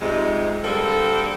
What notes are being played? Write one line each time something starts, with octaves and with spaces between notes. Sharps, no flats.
F2 G#2 C3 G3 G#3 D#4
D3 G3 A#3 C4 G#4 A4